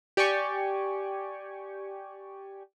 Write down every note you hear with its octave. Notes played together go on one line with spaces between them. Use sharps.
G4 D5 G5 G#5 C#6